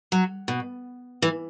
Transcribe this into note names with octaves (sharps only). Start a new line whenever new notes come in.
F#3
B2
E3